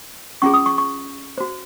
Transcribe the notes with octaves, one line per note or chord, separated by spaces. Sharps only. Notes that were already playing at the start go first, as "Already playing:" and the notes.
C#4 F4 G#4 C#6
D#6
C#6
C#6
F#4 C5